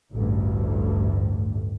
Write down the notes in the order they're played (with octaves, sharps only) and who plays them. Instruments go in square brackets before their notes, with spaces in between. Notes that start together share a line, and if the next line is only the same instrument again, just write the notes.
[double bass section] A1 D2 G2